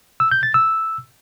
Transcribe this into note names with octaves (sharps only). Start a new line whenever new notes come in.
E6
G6
A6
E6